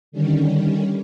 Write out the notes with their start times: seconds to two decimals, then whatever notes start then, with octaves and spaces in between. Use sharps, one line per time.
0.12 D3 D#3 G3 C#4